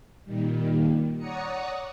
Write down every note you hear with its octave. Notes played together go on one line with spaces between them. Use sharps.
A#2 D#3 G3
C#5 D5 F#5 A#5 D#6 C#7